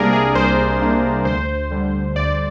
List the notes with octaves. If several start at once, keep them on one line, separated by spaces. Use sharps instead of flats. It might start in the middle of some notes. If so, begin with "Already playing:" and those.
Already playing: C2 C3 G3 A#3 D4 G#4 A#4 D5
G#4
C2 C5
C3 G3 A#3 D4
D2 C5
D3 G3
D2 D5